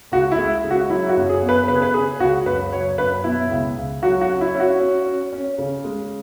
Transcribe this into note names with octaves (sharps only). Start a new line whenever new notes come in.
C#2 F#4
E4
G#3
C#3
F#4
F#3 E4
F#4
F#2
G#4
B3
B4
C#3 B4
G#4
B4
C#3 G#4
C#2 F#4
F#2 B4
F#3 C#5
F#2 B4
B2 E4
C#2
C#2
F#3 F#4
F#4
C#4
E4
C#4
F#4
C#4
C#4
C#4
C#3
G#3